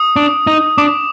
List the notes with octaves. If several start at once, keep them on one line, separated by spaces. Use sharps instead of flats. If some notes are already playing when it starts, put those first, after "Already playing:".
Already playing: D#6
D4
D#4
D4 D6